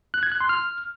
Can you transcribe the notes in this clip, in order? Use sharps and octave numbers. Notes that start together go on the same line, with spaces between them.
F#6
G#6
F#6
C6
F6